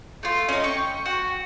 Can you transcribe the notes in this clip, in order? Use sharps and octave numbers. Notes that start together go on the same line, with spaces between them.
A3 F4
C#4 D#4
G5 C#6
F#4